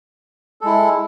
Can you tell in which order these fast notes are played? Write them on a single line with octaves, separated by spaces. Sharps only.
A4 G#3 E4